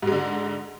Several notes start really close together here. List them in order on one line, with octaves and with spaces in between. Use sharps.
G#2 G#3 D3